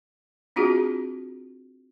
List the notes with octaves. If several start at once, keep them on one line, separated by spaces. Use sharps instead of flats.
C4 D4 F4 F#4 G#4